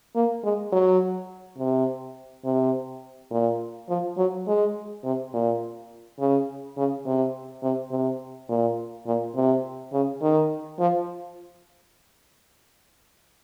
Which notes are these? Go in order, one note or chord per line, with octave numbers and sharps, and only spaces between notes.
A#3
G#3
F#3
C3
C3
A#2
F3
F#3
G#3
C3
A#2
C#3
C#3
C3
C3
C3
A#2
A#2
C3
C#3
D#3
F3